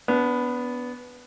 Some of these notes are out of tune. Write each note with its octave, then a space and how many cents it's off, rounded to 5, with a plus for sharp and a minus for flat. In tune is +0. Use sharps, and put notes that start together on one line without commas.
B3 +0 D4 -30